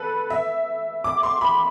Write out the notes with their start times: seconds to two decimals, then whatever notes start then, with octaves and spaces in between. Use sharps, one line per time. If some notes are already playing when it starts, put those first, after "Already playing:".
Already playing: A4 B4
0.30 E5
1.04 D6
1.23 C6
1.41 B5